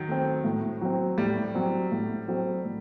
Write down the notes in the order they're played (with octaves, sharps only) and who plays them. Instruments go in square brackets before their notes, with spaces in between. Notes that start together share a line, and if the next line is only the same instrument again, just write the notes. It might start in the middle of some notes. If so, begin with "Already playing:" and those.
Already playing: [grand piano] D#3 F#3
[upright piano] A3 C4
A2
F#3 C4
[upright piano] A2 [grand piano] G3
[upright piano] F#3 C4
A2
F#3 C4 F#4 A4
A2